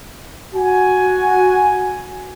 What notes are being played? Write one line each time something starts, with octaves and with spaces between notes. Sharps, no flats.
F#4 G#5